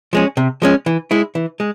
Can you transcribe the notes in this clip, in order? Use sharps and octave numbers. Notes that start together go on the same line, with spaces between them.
F3 G#3 C#4
C3
F3 G#3 C#4
E3
G#3 E4
E3
G#3